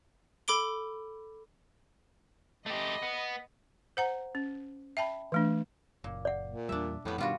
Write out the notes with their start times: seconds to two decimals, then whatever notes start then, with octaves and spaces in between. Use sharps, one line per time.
0.48 A4 B5 D6 D7 G7
2.66 A3 G4 D#5 B5
3.03 B3
3.97 C5 F#5 A#5
4.35 C#4
4.97 E5 G5 A5 B5
5.32 E3 A3 D4
6.04 F#1 A#2
6.25 D5 F#5
6.47 A#2
6.69 E2 G3 D4 E5
7.05 F2 A2 G3 B3
7.18 G2 B2 D#3 G3 F4 F#4